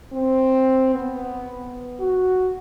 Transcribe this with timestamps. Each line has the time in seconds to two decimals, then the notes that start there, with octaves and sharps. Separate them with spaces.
0.13 C4
0.95 B3
2.00 F#4